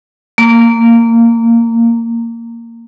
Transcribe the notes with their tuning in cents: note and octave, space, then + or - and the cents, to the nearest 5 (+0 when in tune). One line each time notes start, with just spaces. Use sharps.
A#3 -15